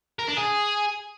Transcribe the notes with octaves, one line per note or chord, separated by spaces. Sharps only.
A#4
D4
G#4